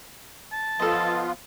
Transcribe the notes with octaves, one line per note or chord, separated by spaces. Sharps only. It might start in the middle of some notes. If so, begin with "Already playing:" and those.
A5
F3 B3 F4 A4 D#5